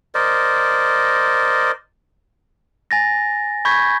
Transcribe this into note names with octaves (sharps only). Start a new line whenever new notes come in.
A#4 C5 D5 D#5
G#5 A6 A#6
B5 C#6 G6 G#6 B6